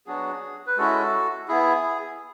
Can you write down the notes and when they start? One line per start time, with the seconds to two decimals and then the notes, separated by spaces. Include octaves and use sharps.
0.06 F#3 B3 D4 F#4 G#4
0.66 B4
0.77 G#3 C#4 E4 F#4 A4
1.48 B3 E4 G#4